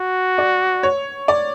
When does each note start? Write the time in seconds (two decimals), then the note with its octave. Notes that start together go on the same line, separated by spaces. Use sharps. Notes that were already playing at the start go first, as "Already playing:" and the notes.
Already playing: F#4
0.38 D5
0.83 C#5
1.28 D5